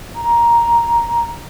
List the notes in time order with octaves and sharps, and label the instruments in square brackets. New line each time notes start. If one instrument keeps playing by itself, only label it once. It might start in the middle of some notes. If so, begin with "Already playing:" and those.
[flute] A#5